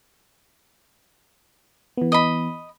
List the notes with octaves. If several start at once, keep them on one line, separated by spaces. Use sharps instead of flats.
E3 B3
D#5 B5